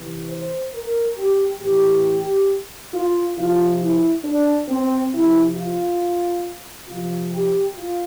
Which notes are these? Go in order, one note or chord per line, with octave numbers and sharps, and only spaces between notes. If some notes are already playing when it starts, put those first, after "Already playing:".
Already playing: C3 E3
C5
A#4
G4
A2 E3 G4
F4
C3 F3 F4
E4
D4
C4
C3 F3 E4
F4
C3 F3 F4
G4
F4